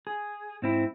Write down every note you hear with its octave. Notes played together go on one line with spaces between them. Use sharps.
G#4
G#2 C4 E4